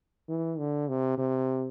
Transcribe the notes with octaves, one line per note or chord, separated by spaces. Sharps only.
E3
D3
C3
C3